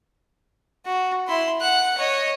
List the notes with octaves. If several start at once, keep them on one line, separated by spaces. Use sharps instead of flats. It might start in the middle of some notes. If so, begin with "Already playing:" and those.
F#4
E4 C6
F#5 F#6
C#5 D#5